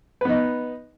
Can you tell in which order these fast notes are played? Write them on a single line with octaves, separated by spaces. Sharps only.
B4 B3 D#4